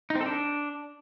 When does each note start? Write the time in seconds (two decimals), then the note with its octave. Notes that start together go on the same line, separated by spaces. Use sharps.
0.10 D#4
0.15 C4
0.21 A4
0.26 D4